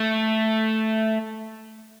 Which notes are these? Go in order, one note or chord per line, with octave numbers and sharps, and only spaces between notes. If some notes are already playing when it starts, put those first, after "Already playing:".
Already playing: A3